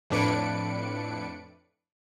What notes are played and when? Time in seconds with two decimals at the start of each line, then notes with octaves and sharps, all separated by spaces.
0.10 F2 A2 D4 B4 C#7 D7